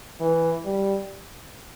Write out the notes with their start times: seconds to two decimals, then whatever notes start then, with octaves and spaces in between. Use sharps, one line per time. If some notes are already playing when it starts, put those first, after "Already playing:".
0.20 E3
0.65 G3